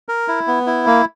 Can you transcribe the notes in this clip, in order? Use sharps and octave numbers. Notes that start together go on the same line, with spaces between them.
A#4
E4
B3
E4
A#3